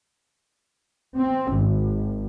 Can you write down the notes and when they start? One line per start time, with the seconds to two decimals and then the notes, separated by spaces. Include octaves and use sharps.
1.16 C4
1.51 G#1